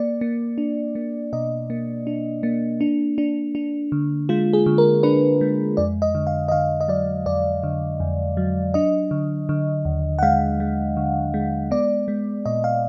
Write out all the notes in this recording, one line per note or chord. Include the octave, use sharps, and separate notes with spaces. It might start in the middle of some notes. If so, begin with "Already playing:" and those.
Already playing: A#3 D5
A#3
D4
A#3
B2 D#5
A#3
D4
A#3
D4
D4
D4
D3
G#3 F4
G#4
D3
A#4
D4 B4
G#3
F2 D5
D#5
D3
F5
D#5
D3 F5
D#5
F#3 D5
F2 D5
D3
F2
F#3
D4 D#5
D3
D3
D#2
F#5
G#3 F5
G#3
D3
G#3
B3 D5
G#3
A#2 D#5
F5